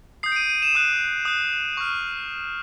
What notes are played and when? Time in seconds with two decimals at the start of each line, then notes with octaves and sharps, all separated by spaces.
0.23 D#6 G6 C7
0.32 D7
0.36 D#7
0.49 D#7
0.62 E7
0.75 D#6 F#6
1.25 D#6 F#6
1.77 C#6 F6